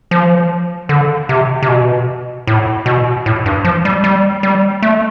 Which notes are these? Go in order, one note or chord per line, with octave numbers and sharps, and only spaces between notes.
F3
D3
C3
C3
B2
A2
B2
A2
G2
F3
G3
G3
G3
A3